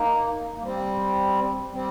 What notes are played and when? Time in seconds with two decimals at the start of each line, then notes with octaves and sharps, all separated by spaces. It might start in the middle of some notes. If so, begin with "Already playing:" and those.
Already playing: A#3 D#4
0.57 A#3
0.62 G3 C4
1.73 G3 C4